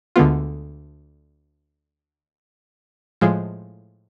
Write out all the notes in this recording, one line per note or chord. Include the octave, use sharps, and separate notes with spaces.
D2 D3 G#3 B3 F4
A2 F3 G#3